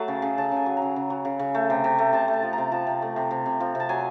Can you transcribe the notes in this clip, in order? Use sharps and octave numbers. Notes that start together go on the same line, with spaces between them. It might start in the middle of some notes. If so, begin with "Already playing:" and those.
Already playing: F#3 A3 A5
C#3
C#3
C#3 A5
C#3 G#5
F#3
C#3 A#5
C#3
F#3
C#3
C#3
A3
C3
C3
A3
C3 A5
A3
A5
F3
C3 A#5
F3 A5
C3
A3
C3
C3
C3
F3
C3 A5
F#3 G#5